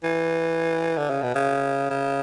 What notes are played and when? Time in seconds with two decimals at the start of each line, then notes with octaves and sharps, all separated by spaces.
0.03 E3
0.97 D3
1.10 C#3
1.22 B2
1.35 C#3
1.90 C#3